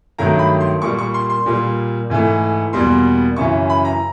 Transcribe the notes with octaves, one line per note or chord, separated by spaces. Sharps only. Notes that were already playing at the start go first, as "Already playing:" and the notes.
G2 D#3 F#3 A3 A#5
B5
C6
A#2 G3 A#3 C#6
C#6
C6
C6
A#2 G3 A#3
G#2 E3 A3
E2 B2 G3 A#3 C6
F#2 C#3 E3 C#6
B5
A#5